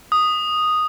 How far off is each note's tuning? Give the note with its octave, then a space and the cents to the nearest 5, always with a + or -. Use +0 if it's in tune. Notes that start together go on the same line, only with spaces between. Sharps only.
D#6 -5